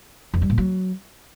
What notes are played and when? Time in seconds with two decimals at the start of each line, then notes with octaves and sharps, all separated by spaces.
0.34 F2
0.42 G3
0.50 A#2
0.58 F#3